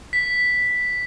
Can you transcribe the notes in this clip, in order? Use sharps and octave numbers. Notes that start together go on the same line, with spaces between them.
B6